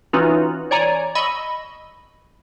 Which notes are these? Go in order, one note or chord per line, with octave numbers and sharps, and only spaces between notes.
E3 C#4 D#4 F4 F#4
C#5 D5 G#5 A#5
D#5 B5 C#6 E6